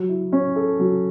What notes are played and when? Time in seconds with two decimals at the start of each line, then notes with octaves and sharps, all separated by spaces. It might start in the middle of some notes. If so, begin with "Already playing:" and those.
Already playing: F#3
0.09 E4
0.32 C#4
0.56 A4
0.79 F#3